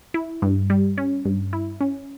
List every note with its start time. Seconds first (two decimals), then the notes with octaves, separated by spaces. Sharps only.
0.14 E4
0.42 G2
0.70 G3
0.98 C#4
1.25 G2
1.53 E4
1.81 C#4